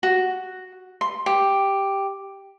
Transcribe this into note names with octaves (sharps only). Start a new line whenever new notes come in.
F#4
C6
G4